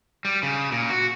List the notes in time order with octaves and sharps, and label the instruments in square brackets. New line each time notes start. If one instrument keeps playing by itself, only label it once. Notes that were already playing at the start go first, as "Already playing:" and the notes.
[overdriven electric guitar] G3
C#3
A#2
F#4